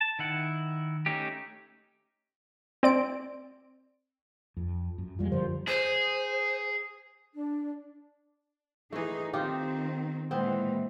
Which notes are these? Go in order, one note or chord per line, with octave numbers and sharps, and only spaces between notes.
A5
D#3 E4 F#5
A3 C#4 D#4 G4
C4 D5 D7
F2
F#2
F2 F3 G3 G#3 F4
F#2 D3 F3 A#4 C5
G#4 C5
D4
E3 A3 D#4 G#4
D#3 C4 D#4 F4 G4
A#2 E3 G#3 B3 C4